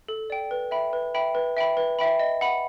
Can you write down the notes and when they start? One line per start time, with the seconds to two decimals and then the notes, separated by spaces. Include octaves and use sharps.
0.08 A4
0.30 D5 G5
0.51 B4
0.71 E5 G5 B5
0.93 B4
1.15 E5 G5 B5
1.35 B4
1.57 E5 G5 B5
1.77 B4
1.99 E5 G5 B5
2.19 D#5
2.41 F#5 B5